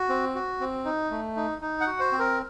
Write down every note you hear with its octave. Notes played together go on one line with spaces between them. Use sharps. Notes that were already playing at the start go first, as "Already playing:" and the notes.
Already playing: F#4
C4
F#4
C4
D#4
A3
D#4
D#4
F#5
F#4
C5
C4
A#4